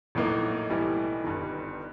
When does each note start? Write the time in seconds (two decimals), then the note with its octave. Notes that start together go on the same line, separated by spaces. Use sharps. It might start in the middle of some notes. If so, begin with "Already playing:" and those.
0.15 A#1 A2 F#3 A#3 D#4
0.70 B1 A2 E3 G3
1.24 G1 G2 D#3